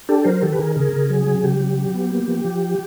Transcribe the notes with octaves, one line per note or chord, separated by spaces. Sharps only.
D4 G4 A4
F#3 A#4 C5
D#3 G4 A4
B4
D#3 G#4 A#4
C#3 G#4 A#4
C#3
F#3 G#4
F#3
C#3 G4
F#3
F#3
B3
A#3
F3
F3